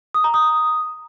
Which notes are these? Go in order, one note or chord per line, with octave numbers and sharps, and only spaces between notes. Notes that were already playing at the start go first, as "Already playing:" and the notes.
D#6
A#5
D#6